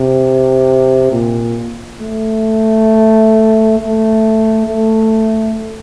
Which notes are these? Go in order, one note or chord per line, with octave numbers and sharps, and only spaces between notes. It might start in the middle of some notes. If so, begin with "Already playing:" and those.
Already playing: C3
A#2
A3
A3
A3